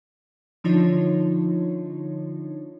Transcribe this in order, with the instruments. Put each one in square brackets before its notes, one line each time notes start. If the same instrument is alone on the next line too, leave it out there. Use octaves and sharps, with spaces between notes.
[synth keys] D3 F3 D4 D#4 F4 C#5